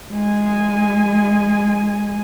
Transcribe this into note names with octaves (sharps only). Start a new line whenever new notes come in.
G#3 G#5